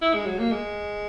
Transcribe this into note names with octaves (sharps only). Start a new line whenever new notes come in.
E4
G#3
F#3
A#3
G#3